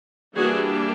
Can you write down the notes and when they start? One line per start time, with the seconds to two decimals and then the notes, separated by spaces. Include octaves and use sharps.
0.37 E3 G3 A#3 D4 F#4 G#4